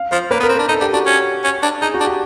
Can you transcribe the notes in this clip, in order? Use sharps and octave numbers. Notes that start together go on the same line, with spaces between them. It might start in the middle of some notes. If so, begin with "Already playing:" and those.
Already playing: F5
F3 C5
A#3 B4
B3
A#4
C4
D4 A#4
D#4 A4
D4 G4
D4 F#4
C#4
C#4
D4
D#4 G#4
F#4
D4
G4